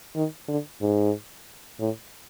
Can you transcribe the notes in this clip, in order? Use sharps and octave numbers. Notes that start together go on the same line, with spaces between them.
D#3
D3
G#2
A2